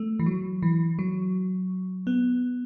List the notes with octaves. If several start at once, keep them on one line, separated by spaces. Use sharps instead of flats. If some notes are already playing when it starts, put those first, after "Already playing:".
Already playing: A3
E3
F#3
E3
F#3
B3